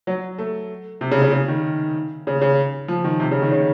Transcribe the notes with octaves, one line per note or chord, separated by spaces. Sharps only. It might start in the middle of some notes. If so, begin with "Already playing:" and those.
F#3
A3
C3
C#3
C#3
C#3
D#3
C#3
C#3
F3
D#3
C3
C#3
D#3
C#3